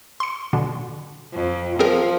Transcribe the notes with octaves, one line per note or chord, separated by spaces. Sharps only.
C6 C#7
B2 D3
F2
F3 C4 G#4 A#4